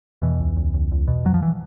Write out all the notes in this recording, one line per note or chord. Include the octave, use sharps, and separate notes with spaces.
E2 B2 E3
C#2
C#2
C#2
C#2
B2
F2 F#3
F3
E3